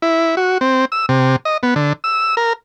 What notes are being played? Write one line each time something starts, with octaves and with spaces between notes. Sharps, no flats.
E4
F#4
C4
E6
C3
D#5
B3
D3
E6
A#4